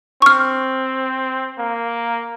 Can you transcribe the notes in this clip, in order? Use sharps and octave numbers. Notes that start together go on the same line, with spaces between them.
C4 C#6 F6
A#3